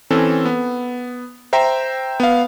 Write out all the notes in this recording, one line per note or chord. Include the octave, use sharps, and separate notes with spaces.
E3 C4 C#4 A4
B3
C5 E5 G5 A#5
B3 F5